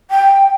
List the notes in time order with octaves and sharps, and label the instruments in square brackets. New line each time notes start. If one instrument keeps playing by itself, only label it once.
[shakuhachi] G5